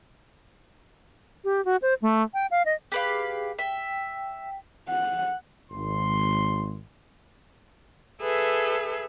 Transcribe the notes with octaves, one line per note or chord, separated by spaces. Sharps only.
G4
F#4
C5
A3
G5
F5
D#5
G4 G#4 B4 F5
E5 G5
F#5
G#1 C6
G#4 A4 B4 E5